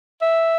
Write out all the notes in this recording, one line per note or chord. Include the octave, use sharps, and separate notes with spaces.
E5